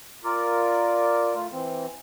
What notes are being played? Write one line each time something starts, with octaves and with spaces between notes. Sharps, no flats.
F4 A#4 D5
A3 F4
E3 C4